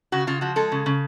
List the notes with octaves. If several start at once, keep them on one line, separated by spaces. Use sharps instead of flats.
C#3 F#4
C#3 F4
F3 F#4
G#3 A4
C#3
C#3